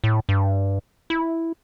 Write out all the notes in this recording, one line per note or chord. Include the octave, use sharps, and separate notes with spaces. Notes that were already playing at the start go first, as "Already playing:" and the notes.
A2
G2
E4